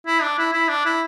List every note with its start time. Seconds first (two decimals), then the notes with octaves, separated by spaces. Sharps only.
0.07 E4
0.22 D4
0.38 E4
0.53 E4
0.68 D4
0.85 E4